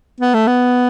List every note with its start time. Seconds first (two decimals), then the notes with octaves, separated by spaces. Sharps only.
0.21 B3
0.34 A3
0.47 B3